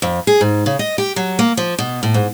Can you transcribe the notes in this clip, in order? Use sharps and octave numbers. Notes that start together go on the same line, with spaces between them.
F2
G#4
G#2
C#3
D#5
G4
F#3
A#3
F3
B2
A2
G#2